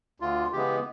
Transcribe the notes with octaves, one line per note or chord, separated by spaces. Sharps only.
D2 F4
C#3 E3 G#3 B3 G4